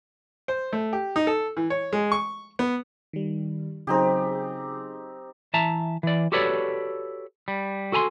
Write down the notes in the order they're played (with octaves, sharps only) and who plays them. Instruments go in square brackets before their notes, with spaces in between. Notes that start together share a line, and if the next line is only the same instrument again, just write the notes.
[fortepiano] C5
A3
G4
D#4
A4
E3
C#5
G#3
C#6
B3
[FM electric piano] D#3 G3
[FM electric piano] C#3 F#3 G#4 [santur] C4 D#4 G4
[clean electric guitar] E3 E5 A5 A#5
E3 D5
F#4 G4 A4 B4 C#5 D5
G3
F#4 A4 G#5 A#5 C6